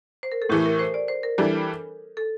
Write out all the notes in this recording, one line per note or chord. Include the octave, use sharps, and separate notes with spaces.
C5
A#4
A4
A2 E3 A3 G4
A#4
C5
D5
C5
A#4
E3 G3 D4 A4
A4